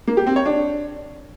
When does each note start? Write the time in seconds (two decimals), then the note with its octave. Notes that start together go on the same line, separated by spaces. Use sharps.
0.07 A#3
0.17 G4
0.27 C4
0.36 C#5
0.46 D4